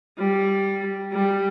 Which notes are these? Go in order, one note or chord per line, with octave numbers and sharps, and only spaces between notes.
G3
G3